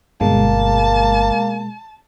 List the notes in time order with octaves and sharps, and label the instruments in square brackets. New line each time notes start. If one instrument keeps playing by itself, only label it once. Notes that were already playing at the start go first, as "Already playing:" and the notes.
[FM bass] G1 [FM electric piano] B2 G#3 [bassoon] A#3 [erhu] A5